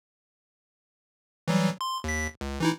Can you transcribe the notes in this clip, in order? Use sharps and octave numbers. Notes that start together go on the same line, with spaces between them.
E3 F#3 G3
C6
D#2 B6
C#2
E3 D#4 E4